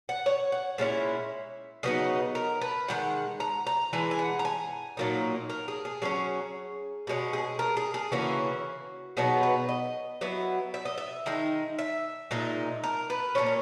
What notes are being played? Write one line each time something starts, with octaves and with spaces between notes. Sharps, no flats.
F#5
C#5
F#5
A#2 G#3 C#4 E4 E5
C#3 F#3 B3 D#4 D#5
A#4
B4
D#3 G#3 F#5
A#5
A#5
E3 G#3 G#5
G#5
F#5
A#5
G#5
A#2 F#3 A#3 D#4
A#4
G#4
G#4
F#3 A#3 C#4 G#4
B2 G#3 C#4
G#4
A#4
G#4
G#4
C#3 E3 A#3 C#4 F#4
B2 F#3 B3 D#4 G#4
B4
D#5
F#3 B3 E4
E5
D#5
E5
D#3 G#3 D#4
E5
A#2 G#3 D#4
A#4
B4
A#2 A#3 C#4 C#5
A#4